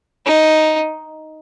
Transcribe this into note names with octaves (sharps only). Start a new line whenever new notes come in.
D#4